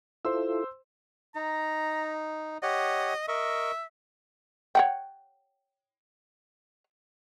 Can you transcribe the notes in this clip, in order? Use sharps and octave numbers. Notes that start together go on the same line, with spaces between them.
E4 F4 A4 C5 C6 E6
D#4 A#5
G4 C#5 D#5 F#5
A#4 D#5 E5 C#6
C#5 F#5 G5